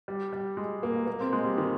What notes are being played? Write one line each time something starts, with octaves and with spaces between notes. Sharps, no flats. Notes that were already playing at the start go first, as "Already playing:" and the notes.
G3
G3
G#3
A#3
A#3
C4
G#3
G3
D#3